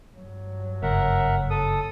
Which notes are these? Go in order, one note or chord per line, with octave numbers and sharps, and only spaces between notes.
G2 F#3
F#1 A#4 E5 F#5
A4 D#6